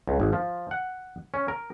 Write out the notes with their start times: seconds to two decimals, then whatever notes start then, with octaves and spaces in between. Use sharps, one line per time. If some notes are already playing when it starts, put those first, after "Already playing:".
0.08 C#2
0.20 G#1
0.33 F3
0.71 F#5
1.34 C#4
1.48 A#4